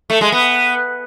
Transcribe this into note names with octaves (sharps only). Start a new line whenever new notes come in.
A3
G#3
B3